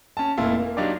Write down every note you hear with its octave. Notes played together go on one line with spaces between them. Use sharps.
C#4 A5
F1 A#2 E4 F4
A#3
F#3 D4 D#4 F4 G4 D5